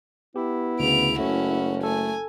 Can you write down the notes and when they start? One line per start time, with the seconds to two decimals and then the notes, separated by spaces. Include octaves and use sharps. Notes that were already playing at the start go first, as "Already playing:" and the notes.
0.36 B3 E4 G4
0.80 D2 C#3 D7 F7
1.19 F#1 A3 C#4 F#4
1.83 A3 A4 G#5